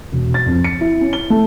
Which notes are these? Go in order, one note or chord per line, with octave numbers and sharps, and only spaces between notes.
E1
A6
F2
C#7
E4
C#4
G7
A3